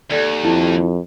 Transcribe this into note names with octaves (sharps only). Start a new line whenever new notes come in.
D#2 A4 D5
F2 E4